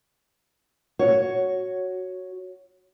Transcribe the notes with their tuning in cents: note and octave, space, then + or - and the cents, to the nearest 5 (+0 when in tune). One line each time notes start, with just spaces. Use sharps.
F#4 +0 C#5 +0